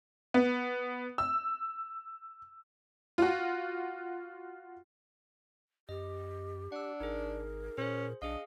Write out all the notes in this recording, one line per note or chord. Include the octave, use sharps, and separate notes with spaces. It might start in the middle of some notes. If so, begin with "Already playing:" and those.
B3
E6
F4 F#4
F#2 G4 D#5
D4 F#5 E6
G#1 D#4 G#4 A#4
A#2 C#4 G#4 C5
B1 D4 G#4 D#5 F5